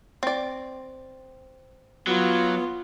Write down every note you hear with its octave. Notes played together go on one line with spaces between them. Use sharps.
C4 D5
F#3 B3 F4